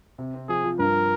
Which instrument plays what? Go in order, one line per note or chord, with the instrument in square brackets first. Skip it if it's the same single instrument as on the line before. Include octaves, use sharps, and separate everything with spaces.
[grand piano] C3
C4
[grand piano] F3 [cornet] G#4
[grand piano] F3
[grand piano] G2 [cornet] A#4